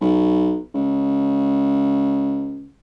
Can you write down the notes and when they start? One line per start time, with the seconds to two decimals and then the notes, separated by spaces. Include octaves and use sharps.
0.01 B1
0.74 C#2